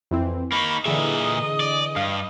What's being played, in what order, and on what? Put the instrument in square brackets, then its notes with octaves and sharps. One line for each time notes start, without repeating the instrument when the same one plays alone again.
[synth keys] F2 E3 C4
[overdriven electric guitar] A#3 D#4 [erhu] B5 [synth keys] C#6
[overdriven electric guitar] A#2 E5 [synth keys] D3 E3 G#4 [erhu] D#5
[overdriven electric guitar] D5
[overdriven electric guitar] G2 [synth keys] F5